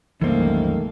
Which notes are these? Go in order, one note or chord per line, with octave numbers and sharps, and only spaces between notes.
C2 F#2 D#3 E3 A3 A#3 C5